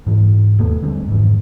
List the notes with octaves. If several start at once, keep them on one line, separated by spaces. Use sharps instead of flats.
G#2 E3
E1 D#2 A3 B3
D3 G3 G#3 C4
F1 G#2 D#3 E3